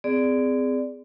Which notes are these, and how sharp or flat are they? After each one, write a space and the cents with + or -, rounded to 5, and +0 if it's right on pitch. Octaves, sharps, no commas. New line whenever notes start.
C4 -35 G#4 -5 D5 +0